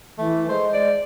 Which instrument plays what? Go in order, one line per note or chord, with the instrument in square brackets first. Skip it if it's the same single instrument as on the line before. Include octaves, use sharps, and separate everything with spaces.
[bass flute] E3 [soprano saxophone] A3
[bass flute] G#3 [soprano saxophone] C5
[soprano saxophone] D5